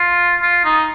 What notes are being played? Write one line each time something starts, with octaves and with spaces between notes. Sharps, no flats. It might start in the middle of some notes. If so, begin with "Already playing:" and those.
Already playing: F4
F4
D#4